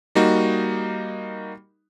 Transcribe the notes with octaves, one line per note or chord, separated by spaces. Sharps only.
G3 A#3 D#4 F#4